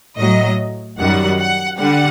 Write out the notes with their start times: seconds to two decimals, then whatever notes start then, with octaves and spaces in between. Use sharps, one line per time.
0.19 A2 F#3 D#5
0.99 F#2 D#3 G3 F#5
1.40 F#5
1.79 D3 G3 F#5